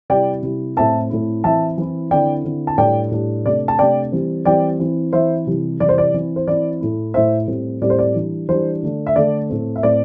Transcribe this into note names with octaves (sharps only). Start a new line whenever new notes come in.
C3 G3 E4 D5 G5
C3 G3 E4
A2 A3 C4 E4 E5 A5
A2 A3 C4 E4
E3 C4 E4 E5 A5
E3 C4 E4
D3 C4 E4 D5 G5
D3 C4 E4
A5
A2 G3 D4 D5 G5
A2 G3 D4
C3 A3 D4 D5
A5
C3 A3 D4 D5 G5
E3 G3 C4
E3 G3 C4 D5 G5
E3 C4 E4
E3 C4 E4 C5 E5
C3 E3 G3 E4
C3 E3 G3 E4 D5
C5
D5
E3 C4 E4
C5
E3 C4 E4 D5
A2 A3 E4
A2 A3 E4 C5 E5
A2 G3 C4
A2 G3 C4 D5
C5
D5
E3 G3 D4
E3 G3 D4 C5
D3 A3 D4
E5
D3 A3 D4 D5
A2 A3 C4
E5
A2 A3 C4 D5